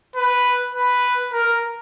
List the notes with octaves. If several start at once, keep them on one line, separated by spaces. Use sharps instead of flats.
B4
B4
A#4